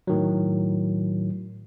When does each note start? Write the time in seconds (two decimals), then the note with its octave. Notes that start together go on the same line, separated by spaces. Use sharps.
0.07 A2 D#3 F#3